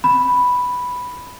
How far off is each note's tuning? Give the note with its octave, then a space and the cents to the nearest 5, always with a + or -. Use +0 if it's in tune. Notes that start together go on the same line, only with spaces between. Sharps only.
B5 +0